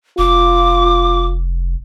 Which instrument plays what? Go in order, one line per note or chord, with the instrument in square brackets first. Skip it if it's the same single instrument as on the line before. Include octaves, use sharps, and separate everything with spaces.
[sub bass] F1 [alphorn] F4 [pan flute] D6